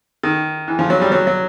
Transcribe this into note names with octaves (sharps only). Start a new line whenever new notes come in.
D#3
E3
F3
F#3
G3
F#3
F#3